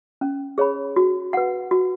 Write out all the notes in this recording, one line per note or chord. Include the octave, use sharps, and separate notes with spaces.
C#4
G#4 C#5 B5
F#4
B4 F#5
F#4